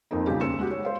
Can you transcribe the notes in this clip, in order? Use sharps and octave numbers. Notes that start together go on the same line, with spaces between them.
F2 A#3 C4 D#4
B1 C#3 G3 G4
D#2 C5 E6 C#7 E7
G#3 F#4 G4
C#5
C5 F5